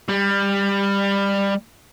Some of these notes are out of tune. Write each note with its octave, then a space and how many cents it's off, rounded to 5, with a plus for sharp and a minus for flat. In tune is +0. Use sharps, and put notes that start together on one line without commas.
G3 +20